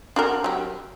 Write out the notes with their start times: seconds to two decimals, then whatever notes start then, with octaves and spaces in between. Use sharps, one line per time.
0.16 D4 F#4 A#4
0.44 F#3 G4